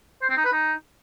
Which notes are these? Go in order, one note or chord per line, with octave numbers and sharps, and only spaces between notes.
C5
C4
D#4
B4
D#4